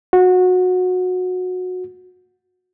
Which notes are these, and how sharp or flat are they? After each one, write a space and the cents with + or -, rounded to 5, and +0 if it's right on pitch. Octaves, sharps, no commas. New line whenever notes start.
F#4 -20